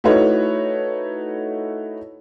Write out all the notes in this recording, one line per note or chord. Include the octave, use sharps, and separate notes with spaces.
A3 D#4 E4 F#4 B4 C#5